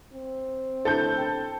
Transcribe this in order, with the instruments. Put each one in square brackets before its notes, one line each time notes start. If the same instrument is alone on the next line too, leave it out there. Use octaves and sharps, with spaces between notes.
[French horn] C4
[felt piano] D3 A3 E4 [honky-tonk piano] A4 G6
[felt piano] G5 A5